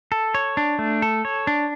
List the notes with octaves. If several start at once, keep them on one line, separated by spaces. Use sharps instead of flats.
A4
C#5
D4
A3
A4
C#5
D4